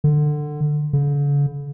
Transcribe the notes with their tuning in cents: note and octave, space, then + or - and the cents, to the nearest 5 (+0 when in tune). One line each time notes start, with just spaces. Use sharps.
D3 +20
D3 -45